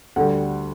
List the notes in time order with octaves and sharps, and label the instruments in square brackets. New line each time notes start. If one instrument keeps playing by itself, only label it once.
[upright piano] D2 D3 G3 F#5